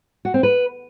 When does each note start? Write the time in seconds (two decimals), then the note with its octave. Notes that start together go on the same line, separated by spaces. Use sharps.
0.25 F#4
0.34 C4
0.43 B4